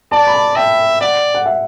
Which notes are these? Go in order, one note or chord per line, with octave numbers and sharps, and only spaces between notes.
D5 A5
B5
A5
E5 G5
D5 F#5
F#5
E5